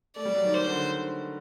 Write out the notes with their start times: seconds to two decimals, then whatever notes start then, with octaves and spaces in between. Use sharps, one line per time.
0.16 A3 D5
0.25 G3
0.35 F#3
0.45 D#3
0.54 C5
0.67 D3